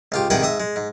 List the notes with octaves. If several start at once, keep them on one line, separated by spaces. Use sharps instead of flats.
C#2 F4 G4
C2 D#3 G#4 B4 F#5 G5
G#2 E5 D#6
G#3
G#2